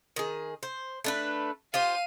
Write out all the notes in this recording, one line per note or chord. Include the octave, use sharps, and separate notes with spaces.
D#3 G#4
C5
A3 D4 B4
F4 G4 C5 F5 D#7